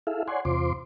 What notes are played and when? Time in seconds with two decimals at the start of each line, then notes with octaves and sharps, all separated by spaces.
0.07 E4 G#4 A4 E5 F5
0.28 C#5 D5 F#5 G#5 C6
0.45 E2 C3 F4 C5 C6 D6